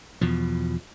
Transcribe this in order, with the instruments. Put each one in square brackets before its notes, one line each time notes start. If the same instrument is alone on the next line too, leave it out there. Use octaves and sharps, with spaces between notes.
[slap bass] E2 B2 F3